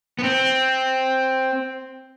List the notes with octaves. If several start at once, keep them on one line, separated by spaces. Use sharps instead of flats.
B3
C4